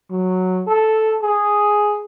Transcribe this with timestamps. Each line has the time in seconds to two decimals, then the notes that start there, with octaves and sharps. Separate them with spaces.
0.10 F#3
0.67 A4
1.22 G#4